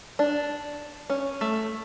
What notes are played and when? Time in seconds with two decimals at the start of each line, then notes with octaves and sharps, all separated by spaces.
0.19 D4
1.10 C#4
1.41 A3